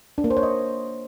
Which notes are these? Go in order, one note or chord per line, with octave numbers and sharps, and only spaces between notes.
D4
A#3
C5
C#5
D#5